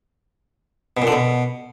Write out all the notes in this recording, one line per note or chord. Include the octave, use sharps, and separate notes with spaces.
B2
A#2
D3
B2